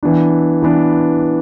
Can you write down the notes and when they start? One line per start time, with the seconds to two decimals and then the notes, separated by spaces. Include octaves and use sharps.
0.03 E3 B3 D4
0.62 E3 B3 D4